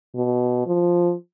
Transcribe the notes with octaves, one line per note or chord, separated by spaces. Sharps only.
B2
F3